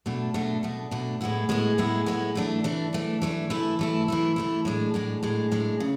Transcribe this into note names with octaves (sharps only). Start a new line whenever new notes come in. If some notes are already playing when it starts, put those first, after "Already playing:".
B2 A3 D4
B2 A3 D4
B2 A3 D4
B2 A3 D4
A2 G#3 B3 E4
A2 G#3 B3 E4
A2 G#3 B3 E4
A2 G#3 B3 E4
E3 A3 D4
E3 A3 D4
E3 A3 D4
E3 A3 D4
E3 A3 E4
E3 A3 E4
E3 A3 E4
E3 A3 E4
A2 G#3 D4
A2 G#3 D4
A2 G#3 D4
A2 G#3 D4
C#3